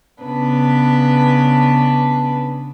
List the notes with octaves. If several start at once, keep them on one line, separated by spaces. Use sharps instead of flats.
C#3 B3 D4 B4